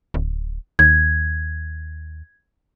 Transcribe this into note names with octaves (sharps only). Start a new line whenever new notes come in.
D1
D#2 G#6